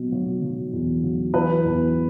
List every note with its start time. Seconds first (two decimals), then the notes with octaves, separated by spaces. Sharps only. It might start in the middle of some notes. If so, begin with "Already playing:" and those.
Already playing: B2 F#3
0.12 F#3
0.42 F#3
0.73 E2
1.04 F#3
1.34 E3 B4
1.65 E2